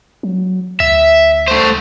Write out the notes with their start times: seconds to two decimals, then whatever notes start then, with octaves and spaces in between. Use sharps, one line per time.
0.23 F#3
0.80 D2 E5
1.48 A3 C5